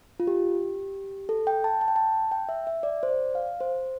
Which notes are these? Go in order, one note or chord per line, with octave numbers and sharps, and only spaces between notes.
F4
G4
A4
G5
A5
A5
G5
A5
G5
E5
E5
D5
C5
D5
F5
C5